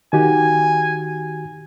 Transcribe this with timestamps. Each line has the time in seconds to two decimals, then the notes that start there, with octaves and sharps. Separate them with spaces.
0.13 D#3 F#4 G4 G#5